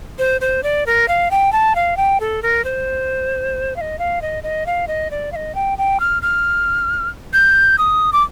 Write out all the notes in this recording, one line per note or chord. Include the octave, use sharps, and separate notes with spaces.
C5
C5
D5
A#4
F5
G5
A5
F5
G5
A4
A#4
C5
F5
D#5
F5
D#5
D#5
F5
D#5
D5
F5
D#5
G5
G5
F6
F6
G6
D#6
D6